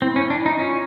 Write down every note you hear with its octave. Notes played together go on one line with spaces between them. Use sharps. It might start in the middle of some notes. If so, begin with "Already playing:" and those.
C4 E4
C#4
D4
D#4
C#4 F4